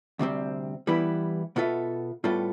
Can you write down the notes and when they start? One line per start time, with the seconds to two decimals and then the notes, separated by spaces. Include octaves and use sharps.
0.19 D2 C3 G3 C4
0.87 E3 G3 B3 E4 B4
1.56 B2 B3 F4 A4 E5
2.24 A2 G3 B3 F4 A4